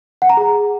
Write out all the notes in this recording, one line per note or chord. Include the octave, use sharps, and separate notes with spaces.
F#5
A#5
G#4